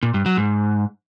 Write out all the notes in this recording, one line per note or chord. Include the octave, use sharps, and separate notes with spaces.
A#2
G2
F#3
G#2